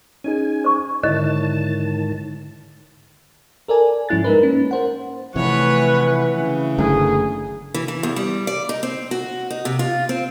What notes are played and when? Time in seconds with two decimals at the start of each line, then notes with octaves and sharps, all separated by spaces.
0.24 C#4 D#4 G#4 G#5
0.64 C5 C#6
1.04 G#2 D3 D#3 E4 C#5 D#5 A5
3.68 A4 A#4 D5 G#5
4.09 G#2 F3 C#4 E4 F#6 A6
4.24 G#3 D#4 A#4 B4
4.43 A#3 C#4
4.71 A#4 C5 F#5
5.36 C3 E3 F3 A3 B4 C#5 F#5
6.38 C#3
6.78 F#1 D3 A3 G#4
7.74 E3
7.88 E3
8.03 E2
8.16 G3
8.47 D5
8.69 D#4
8.83 C4
9.11 F#4
9.50 D#4
9.65 C3
9.79 F4
10.09 C4